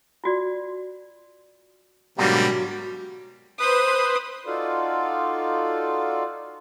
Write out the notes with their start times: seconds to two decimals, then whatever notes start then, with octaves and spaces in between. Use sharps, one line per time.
0.24 F4 F#4 D5
2.18 G#2 B2 D3 F#3 G3 A#3
3.60 B4 C5 D#6
4.46 D#4 F4 F#4 A4 D5 F5